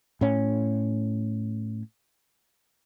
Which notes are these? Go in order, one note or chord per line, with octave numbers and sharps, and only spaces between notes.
A2 C#4